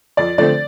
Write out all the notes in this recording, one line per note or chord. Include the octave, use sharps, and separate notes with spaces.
F2 D5
D3 F3 A3 C4 D5